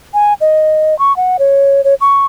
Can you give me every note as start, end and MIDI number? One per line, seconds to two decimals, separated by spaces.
0.14 0.34 80
0.41 0.97 75
0.99 1.15 85
1.17 1.37 78
1.39 1.81 73
1.84 1.94 73
2.01 2.26 85